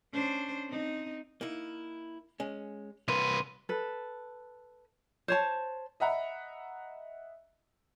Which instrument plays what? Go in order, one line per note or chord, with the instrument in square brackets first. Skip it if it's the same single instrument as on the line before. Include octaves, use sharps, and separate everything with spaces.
[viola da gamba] C#4 D4 C5
C4 D#4
[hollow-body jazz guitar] A#3 D#4 E4
G#3 C#4
[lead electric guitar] C2 B4 [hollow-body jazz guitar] A#3 [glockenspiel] C6 D#7 E7
[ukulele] A4 B4
C5 C#5 A5
[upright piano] D#5 E5 F#5 A#5 B5